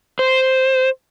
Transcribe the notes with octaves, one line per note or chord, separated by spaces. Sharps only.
C5